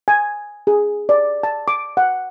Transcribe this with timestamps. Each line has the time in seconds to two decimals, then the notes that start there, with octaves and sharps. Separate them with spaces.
0.08 G#5
0.67 G#4
1.09 D5
1.43 A5
1.68 D6
1.97 F#5